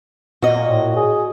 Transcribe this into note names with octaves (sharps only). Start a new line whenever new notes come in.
A#2 F#4 D#5
A2
G#4